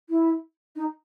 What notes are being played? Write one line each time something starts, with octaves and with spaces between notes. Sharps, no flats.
E4
D#4